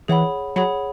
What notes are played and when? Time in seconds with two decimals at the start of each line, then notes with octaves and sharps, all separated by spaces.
0.08 E3 G#4 C#5 F#5 B5
0.56 F#3 G#4 C#5 F#5 B5